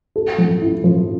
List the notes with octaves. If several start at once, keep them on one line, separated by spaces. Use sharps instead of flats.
A4
F3
E4
F3